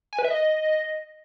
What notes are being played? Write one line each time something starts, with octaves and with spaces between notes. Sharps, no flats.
G#5
B4
E5
D#5